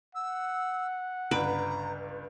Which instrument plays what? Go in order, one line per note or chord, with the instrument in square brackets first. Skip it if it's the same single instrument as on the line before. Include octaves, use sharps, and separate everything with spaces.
[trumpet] F#5 [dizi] E6
[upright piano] G1 C#2 D7 [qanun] B4 [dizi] A#5